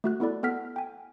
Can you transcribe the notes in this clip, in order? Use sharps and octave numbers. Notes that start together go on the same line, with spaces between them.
A3 F#4 F#6
B3 E4 A4 D5 B5
B3 A4 F#5 F6 B6
G5 G#5